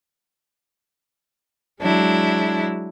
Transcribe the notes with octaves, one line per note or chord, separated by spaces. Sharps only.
F#3 G#3 D4 E4